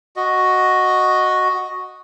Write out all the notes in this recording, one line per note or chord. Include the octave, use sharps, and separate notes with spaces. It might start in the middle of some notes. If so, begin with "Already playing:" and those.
F#4 D#5